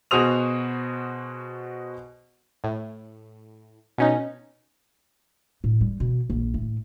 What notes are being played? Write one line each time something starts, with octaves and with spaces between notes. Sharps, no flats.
B2 F#4 G#4 C5 D#6 F7
A2
B2 C#4 D#4
A2
G3
B2
A#1
A2